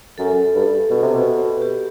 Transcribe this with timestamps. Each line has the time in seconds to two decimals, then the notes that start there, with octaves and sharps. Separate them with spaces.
0.18 F#2 A4
0.54 G2
0.90 B2
1.02 C3
1.14 B2
1.62 G4